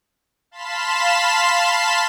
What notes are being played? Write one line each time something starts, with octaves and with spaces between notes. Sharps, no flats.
F5 A5 B5 C6 B6 E7